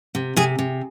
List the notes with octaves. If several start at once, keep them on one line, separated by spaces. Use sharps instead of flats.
C3
C3 G#4
C3